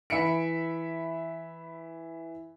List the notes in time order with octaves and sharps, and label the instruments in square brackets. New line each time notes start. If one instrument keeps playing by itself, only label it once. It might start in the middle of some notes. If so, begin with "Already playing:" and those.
[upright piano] E3 E5 B5 C#7 D7